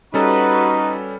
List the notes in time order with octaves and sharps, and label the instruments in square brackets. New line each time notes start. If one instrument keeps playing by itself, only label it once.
[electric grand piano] G3 C#4 A4 [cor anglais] D#4 [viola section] F#4 B4